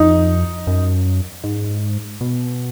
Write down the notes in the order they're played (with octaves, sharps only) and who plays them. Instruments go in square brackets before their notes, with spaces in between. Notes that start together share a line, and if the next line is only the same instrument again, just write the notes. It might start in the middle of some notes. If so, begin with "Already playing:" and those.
Already playing: [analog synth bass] F2 [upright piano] D#4
[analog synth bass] F#2
G#2
B2